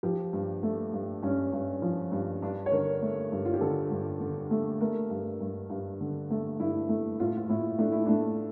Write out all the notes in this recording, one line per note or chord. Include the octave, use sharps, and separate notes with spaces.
F3 G4
G2
A3
G2
G2 C#4
G2
F3
G2
G2 D4
C#5
D3 A#4
A3
G2
F4
G4
D3 A4
G2
D3
A3
A3 A#4
G2
G2
G2
D3
A3
G2 E4
A3
A2 F4
F4
A2 E4
A3 D4
E4
A3 D4